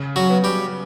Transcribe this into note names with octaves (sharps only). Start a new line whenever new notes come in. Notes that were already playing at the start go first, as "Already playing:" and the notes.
Already playing: C#3
F#3 F#4
B3
G3 G4